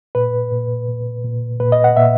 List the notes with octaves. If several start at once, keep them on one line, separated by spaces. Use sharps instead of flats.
A#2 B4
A#2
A#2
A#2
A#2 B4
D#5
F#5
A#2 E5